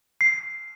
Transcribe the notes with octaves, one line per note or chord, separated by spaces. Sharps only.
C7